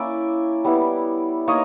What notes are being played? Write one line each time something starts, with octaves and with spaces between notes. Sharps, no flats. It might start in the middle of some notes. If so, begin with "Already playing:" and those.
Already playing: A#3 C#4 E4 D5 E5
G3 B3 E4
A#3 D#4 C#5 D#5